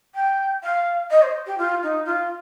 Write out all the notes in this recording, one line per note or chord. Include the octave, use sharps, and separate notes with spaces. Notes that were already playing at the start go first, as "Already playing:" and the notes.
G5
F5
D#5
C5
G4
F4
D#4
F4